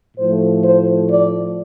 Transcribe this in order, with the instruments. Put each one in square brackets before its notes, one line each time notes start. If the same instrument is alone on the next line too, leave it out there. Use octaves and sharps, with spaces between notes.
[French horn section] A2 F3 A3 C5
C5
D5